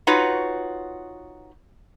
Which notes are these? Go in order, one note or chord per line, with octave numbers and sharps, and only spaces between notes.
D#4 F4 F#4 B4 C#5